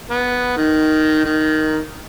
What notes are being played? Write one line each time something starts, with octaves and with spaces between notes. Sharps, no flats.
B3
D#3
D#3